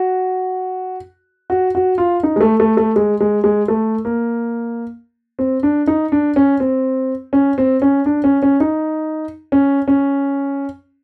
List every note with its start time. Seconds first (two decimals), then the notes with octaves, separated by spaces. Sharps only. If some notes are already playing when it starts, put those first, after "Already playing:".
Already playing: F#4
1.50 F#4
1.75 F#4
1.98 F4
2.23 D#4
2.36 G#3
2.41 A3
2.60 A3
2.77 A3
2.96 G#3
3.20 G#3
3.44 G#3
3.68 A3
4.05 A#3
5.39 C4
5.63 D4
5.87 D#4
6.12 D4
6.36 C#4
6.60 C4
7.33 C#4
7.58 C4
7.82 C#4
8.06 D4
8.24 C#4
8.43 C#4
8.60 D#4
9.52 C#4
9.88 C#4